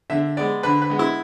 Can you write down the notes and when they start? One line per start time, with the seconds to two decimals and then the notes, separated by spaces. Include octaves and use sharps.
0.10 D3 E5
0.37 G#3 B3 D5
0.63 D3 B4
0.82 B4
0.90 G#3 B3
0.99 E4